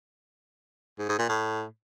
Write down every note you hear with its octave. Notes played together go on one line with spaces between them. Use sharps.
G#2
G#2
A#2
A2